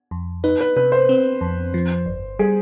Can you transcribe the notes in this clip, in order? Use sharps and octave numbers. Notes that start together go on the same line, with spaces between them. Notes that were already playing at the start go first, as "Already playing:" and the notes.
F2
D#4 B4
B4
C3 B4
C5
C4
F2
F3
G1
G3 G#4